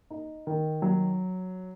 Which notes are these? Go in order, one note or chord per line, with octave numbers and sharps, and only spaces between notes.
D#4
D#3
F#3